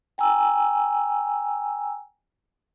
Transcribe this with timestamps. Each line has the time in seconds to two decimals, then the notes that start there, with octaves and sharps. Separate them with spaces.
0.18 G5 G#5 A#5 E6